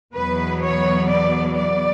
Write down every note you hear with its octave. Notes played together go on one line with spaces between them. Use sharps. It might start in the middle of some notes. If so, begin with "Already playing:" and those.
E2 B2 F#3 B3 B4
C#5
D5
D5